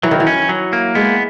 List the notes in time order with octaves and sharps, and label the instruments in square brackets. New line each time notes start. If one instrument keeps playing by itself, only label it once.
[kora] E3 [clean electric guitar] F#3
[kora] D#3
E3
[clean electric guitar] C#4
F#3
A#3
[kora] G#3 [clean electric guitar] B3